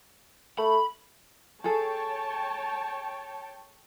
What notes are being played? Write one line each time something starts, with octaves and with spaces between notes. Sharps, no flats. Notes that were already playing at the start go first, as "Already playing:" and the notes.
A3 B5
G#4 A4 C#5 G5 A5